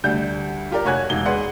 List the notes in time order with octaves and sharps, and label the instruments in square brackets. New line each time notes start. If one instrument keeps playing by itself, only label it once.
[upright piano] D2 G3 D4 G6
F4 G4 A#4 D5
F1 F#4 C#5 G#5 F#6 G#6
E1 D#4 G7
G#4 B4 D5 F#5 C6